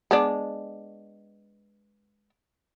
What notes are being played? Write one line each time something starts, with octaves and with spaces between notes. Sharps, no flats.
G#3 B3 D4